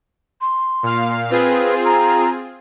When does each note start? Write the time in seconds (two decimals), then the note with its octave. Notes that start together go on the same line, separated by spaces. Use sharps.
0.41 C6
0.83 A#2 F5
1.30 C4 F4 G#4 B4
1.85 A#5